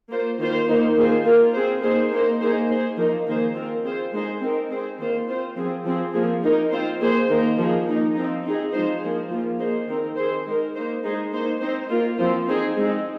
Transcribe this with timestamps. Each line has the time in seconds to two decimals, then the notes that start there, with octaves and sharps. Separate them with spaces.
0.10 A#3 F4 C5
0.39 D#3 A#3 F4 C5
0.67 D#3 A#3 D#4 C5
0.96 D#3 A#3 F4 G#4 C5
1.25 A#3 F4 A#4
1.53 C4 G#4 C5
1.82 A#3 D#4 G#4 C5
2.11 A#3 D#4 C5
2.40 A#3 D#4 G#4 C5
2.69 A#3 G#4 C5
2.97 F3 A#3 D#4 A#4
3.26 D#3 A#3 D#4 G#4 C5
3.55 C4 F4 A#4
3.84 C4 F4 G#4 C5
4.12 G#3 D#4 G#4 C5
4.41 C4 D#4 A#4
4.71 C4 G#4 C5
4.99 D#3 A#3 F4 C5
5.28 C4 F4 C5
5.57 F3 C4 G#4
5.85 F3 C4 G#4
6.14 F3 A#3 G#4
6.43 A#3 D#4 A#4
6.72 C4 F4 C5
7.01 A#3 G#4 C5
7.29 D#3 A#3 D#4 A#4
7.58 F3 A#3 G#4
7.87 A#3 D#4 A#4
8.15 F3 C4 D#4
8.44 C4 D#4 G#4
8.72 F3 G#3 D#4 C5
9.02 F3 A#3 G#4
9.31 F3 A#3 F4
9.59 A#3 D#4 G#4 C5
9.88 D#3 C4 D#4 A#4
10.17 D#3 C4 G#4 C5
10.46 G#3 D#4 A#4
10.75 A#3 D#4 C5
11.04 G#3 D#4 G#4 C5
11.32 A#3 D#4 C5
11.61 C4 D#4 C5
11.90 A#3 F4 A#4
12.18 F3 C4 F4 C5
12.47 C4 D#4 G#4 C5
12.76 G#3 C4 D#4